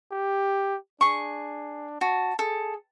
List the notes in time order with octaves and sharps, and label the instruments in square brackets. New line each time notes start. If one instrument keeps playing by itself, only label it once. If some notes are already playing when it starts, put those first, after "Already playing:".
[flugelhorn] G4
[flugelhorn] D4 [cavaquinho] G#4 C#6
[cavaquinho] F#4 [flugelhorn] A5
[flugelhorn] G#4 [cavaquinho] A4